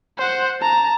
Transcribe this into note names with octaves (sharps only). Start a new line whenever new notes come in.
C5 F#5
A5 A#5